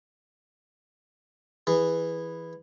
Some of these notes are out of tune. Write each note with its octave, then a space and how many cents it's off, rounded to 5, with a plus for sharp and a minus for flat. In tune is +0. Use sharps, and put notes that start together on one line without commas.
E3 +0 G#4 -15